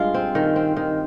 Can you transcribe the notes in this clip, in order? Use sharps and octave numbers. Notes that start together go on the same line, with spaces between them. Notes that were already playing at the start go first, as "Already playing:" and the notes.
Already playing: G2 G#3 F4
C4
D#3
C4
D#3